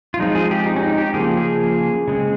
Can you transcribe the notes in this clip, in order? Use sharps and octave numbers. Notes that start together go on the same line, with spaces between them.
F4
F3 G#3 C4 D#4
G#4
G4
D#4
C#4
D#4
G4
C#3 F3 A#3 G#4
G#4
C#3 G#3 C4